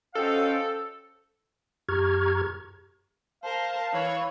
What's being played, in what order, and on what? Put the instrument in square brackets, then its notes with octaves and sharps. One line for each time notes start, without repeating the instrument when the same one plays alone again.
[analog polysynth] C#4 F#4 C5 [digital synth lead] A4 [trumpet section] D#5 F5 G5
[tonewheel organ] F#2 G4 A#5 C#6 F6 G#6
[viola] A#4 C5 [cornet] F5 [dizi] A5
[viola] E3 [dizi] C#5